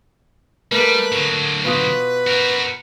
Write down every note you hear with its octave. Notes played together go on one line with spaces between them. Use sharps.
G3 A3 A#3 A#4 B4
D3 F#3
B2 F4 B4 D#6
F#4 A#4